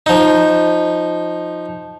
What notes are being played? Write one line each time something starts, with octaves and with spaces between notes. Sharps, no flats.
F3 D#4